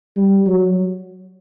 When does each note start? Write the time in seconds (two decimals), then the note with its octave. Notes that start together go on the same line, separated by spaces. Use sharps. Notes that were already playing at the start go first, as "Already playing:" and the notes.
0.17 G3
0.47 F#3